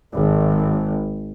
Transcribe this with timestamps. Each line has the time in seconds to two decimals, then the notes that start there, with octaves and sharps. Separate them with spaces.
0.13 G#1